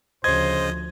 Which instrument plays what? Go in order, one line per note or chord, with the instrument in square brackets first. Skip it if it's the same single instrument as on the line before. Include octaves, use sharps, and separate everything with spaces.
[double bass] D2 F3 [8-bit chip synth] C#3 D#5 [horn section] C5 [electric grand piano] G#6